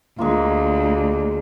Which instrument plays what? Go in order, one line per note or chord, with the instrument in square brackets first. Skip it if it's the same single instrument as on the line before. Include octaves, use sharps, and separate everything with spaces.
[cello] D2 [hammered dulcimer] G#3 A#3 F4